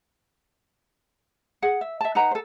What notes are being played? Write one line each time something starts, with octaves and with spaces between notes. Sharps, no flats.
G#4 F#5
E5
E5 A5
D#4 B4 F#5 A#5
A4 C5